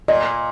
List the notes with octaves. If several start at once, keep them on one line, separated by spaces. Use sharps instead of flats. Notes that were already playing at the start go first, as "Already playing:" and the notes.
A#2 D#5